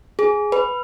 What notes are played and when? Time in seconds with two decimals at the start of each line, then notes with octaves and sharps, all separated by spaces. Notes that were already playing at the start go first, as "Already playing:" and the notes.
0.19 G#4
0.52 B4